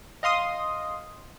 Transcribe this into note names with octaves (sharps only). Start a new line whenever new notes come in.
D#5 F5 C6 D#6